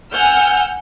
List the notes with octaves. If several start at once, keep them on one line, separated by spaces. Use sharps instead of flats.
F#5 G#5 E6 F6 G6